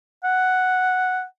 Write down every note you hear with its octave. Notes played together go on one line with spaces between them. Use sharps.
F#5